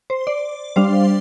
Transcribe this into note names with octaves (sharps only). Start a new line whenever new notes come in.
C5
D5
G3 D4 C5 F5